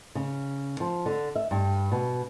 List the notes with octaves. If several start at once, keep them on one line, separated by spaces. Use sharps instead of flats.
C#3
F3
D3
E5
G2
B2